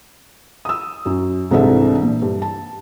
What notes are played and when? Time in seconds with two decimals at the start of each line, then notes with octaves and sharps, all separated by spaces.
0.65 D#6 E6
1.06 F#2
1.51 C2 G#2 E3 D4 A4 E5
2.03 A#2
2.22 G2
2.42 A5